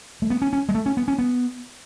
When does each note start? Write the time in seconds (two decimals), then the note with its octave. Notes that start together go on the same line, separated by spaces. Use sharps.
0.22 A3
0.30 B3
0.42 C#4
0.53 C#4
0.69 G#3
0.75 A3
0.86 C#4
0.97 B3
1.08 C#4
1.19 B3